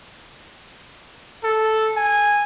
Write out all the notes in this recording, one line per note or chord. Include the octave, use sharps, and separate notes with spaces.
A4
G#5